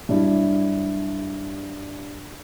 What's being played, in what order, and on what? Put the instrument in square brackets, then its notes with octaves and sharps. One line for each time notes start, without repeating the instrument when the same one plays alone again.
[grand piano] G2 F#3 D4 E4